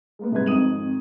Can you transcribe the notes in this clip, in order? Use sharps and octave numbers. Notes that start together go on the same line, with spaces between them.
G#3 A#3 B3
C2 G#2 G#3 B4 G#6
G#1 F2 D#4 D#6 D#7 F#7